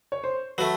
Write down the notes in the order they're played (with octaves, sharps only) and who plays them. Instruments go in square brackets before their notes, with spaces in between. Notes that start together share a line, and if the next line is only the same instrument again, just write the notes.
[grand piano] C#5
C5
[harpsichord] F#3 A3 [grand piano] B4